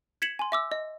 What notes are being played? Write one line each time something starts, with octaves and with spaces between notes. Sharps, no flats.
G#6 B6 C#7 E7 F#7
G#5 C6
E5 D6 E6
D#5